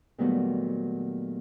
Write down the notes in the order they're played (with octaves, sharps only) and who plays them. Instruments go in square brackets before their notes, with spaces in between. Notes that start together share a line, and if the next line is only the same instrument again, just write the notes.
[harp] A#2 D#3 F#3 G3 A3 B3